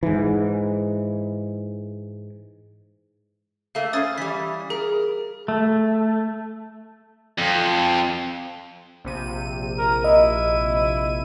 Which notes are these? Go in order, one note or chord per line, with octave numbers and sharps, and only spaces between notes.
G#2 E3
A3 A#3 F5
C#4 B4 C5 D#6 G#6 A6
E3 G3 B6
G#4 A#4
A3
F2
A#1 C3 D#7
A#4
E4 D#5